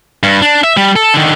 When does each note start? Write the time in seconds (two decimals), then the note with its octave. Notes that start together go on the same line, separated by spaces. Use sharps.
0.23 G2
0.42 D4
0.64 E5
0.77 G3
0.96 A4
1.14 D3 D#3